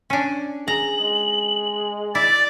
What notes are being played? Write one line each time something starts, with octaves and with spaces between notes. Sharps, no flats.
C#4 D4
G#4 A#5 F#7
G#3
E4 D5 A6